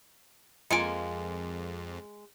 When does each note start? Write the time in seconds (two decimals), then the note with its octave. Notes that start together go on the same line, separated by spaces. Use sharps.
0.71 F2 G#3 A#3 F4 G#5 C#7 D7